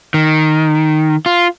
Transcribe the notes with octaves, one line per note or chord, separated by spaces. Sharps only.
D#3
F4